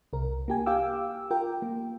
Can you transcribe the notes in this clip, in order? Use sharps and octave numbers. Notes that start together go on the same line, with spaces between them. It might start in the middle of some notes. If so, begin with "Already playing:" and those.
C2 A#4
A#3 G4 G#5
G4 F5 G5 D6 E6
F4 A#4 G5
A#3